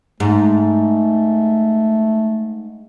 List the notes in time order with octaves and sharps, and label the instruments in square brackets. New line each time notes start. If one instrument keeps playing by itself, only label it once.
[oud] G#2 [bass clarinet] A3